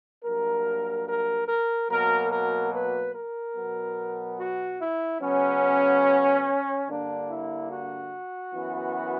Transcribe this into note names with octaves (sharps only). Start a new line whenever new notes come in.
G2 F#3 A#3 A#4
A#4
A#4
B2 F#3 A#3 A#4
A#4
B4
A#4
B2 F#3 B3
F#4
E4
C#3 F#3 B3 C#4
G2 D3 A#3 D4
E4
F#4
F#2 E3 B3